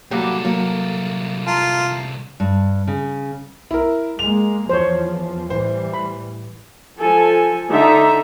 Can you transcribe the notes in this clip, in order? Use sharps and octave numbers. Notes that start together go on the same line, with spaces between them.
C2 F#3 G3 A#3 G4 A4 D6
F#3 A#3
F4 A5 A#5 C6
G2
C#3
E4 A#4
G#3 A#3 F7
E2 F3 C5 C#5
A2 E3 G3 C5
B5
F3 A4 G#5
D3 D#4 E5 A#5